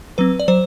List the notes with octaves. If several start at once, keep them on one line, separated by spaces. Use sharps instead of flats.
F#3 C4 B4
D5
F#3 C5